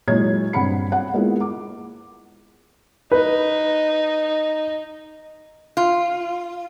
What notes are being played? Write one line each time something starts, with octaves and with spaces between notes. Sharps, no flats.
A#2 F#3 G#3 E4 C#5 G#6
G2 C4 F#5 B5 C#7
F#5
G#3 A#3 B3 E4 F4 G#4
D6
D#4 B4
F4